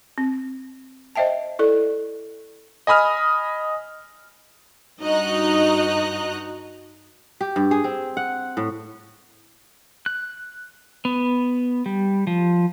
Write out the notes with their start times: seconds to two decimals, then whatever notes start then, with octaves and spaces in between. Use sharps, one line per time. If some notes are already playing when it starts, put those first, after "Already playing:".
0.18 C4
1.16 C5 D#5 E5 G5 A5
1.59 E4 A4 D5
2.87 D#5 G#5 B5 D#6 F6
5.01 G2 D#4 F#4 D#5 A#5 F#6
7.41 G4
7.56 G2
7.71 G#4
7.84 C4
8.17 F#5
8.57 A2
10.06 F#6
11.05 B3
11.86 G3
12.27 F3